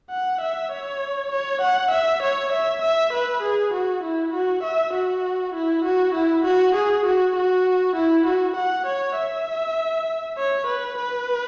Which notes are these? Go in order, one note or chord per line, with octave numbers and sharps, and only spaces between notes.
F#5
E5
C#5
C#5
F#5
E5
C#5
E5
E5
B4
G#4
F#4
E4
F#4
E5
F#4
E4
F#4
E4
F#4
G#4
F#4
F#4
E4
F#4
F#5
C#5
E5
C#5
B4
B4